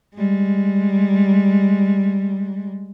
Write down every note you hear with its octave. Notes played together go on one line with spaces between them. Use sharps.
G3 G#3